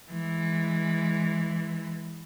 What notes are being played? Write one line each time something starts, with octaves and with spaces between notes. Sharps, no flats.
E3 G#3